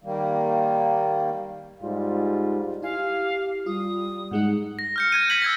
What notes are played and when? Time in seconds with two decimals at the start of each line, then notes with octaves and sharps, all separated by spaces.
0.04 D#3 G3 A#3
1.82 G#2 G3 F4
2.82 E4 G4 F5 G#5
3.66 G3 F4 D#6
4.31 G#2 G#3 D#4 F#5
4.79 A#6
4.96 F6 G6 C#7
5.12 G6 G#6 D#7
5.30 G6 B6 F#7
5.42 E6 G#6 A#6